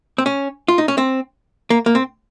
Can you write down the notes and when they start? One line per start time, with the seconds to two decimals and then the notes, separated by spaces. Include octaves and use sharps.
0.18 C4
0.26 C#4
0.68 F4
0.78 D#4
0.88 C#4
0.98 C4
1.70 A#3
1.86 A#3
1.95 C4